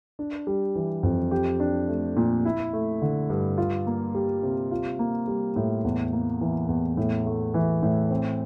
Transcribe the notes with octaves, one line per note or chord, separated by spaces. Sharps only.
D4
G3
E3
F2
G4
D4
A3
A#2
E4
A3
D3
G2
F4
A#3
G3
C3
F4
A#3
G3
A2
E2
A#3
E3
E2
A2
A3
E3
A2
C4